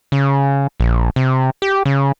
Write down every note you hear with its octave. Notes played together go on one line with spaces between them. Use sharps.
C#3
A#1
C3
G4
C#3